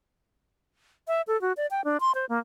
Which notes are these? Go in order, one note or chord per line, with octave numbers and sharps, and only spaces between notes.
E5
A4
F#4
D5
G5
D4
C6
C5
A#3